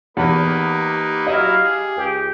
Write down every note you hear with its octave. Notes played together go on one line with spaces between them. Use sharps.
E2 A#3 D#4 G4 B4
F#3 E4 D#5 F5
G#4
C#2 G4